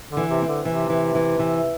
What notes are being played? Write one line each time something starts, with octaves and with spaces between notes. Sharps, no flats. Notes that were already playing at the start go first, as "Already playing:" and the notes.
D3
E3
C3
C4
D3
C3 E3
E3
E3
E3